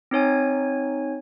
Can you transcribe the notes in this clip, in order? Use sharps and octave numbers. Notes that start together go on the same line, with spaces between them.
C4 D#4 C#5 G#5